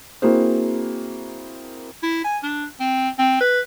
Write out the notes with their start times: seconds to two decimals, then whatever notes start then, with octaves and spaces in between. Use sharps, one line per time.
0.22 A#3 C4 E4 F#4 G#4 C5
2.03 E4
2.24 G#5
2.43 D4
2.80 C4
3.19 C4
3.41 B4